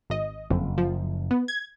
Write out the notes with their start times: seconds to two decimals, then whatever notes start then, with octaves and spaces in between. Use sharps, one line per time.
0.10 G#1 D#5
0.50 F#1 F2
0.78 F3
1.31 B3
1.48 G#6